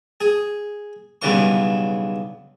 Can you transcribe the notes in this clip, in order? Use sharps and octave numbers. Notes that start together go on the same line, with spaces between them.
G#4
B1 G2 C#3 E3 C#6